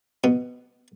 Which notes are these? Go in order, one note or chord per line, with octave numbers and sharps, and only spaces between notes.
B2